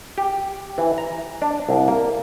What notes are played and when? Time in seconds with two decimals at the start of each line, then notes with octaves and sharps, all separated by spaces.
0.18 G4
0.78 E3
0.98 A#5
1.42 D4
1.69 C2
1.88 A#3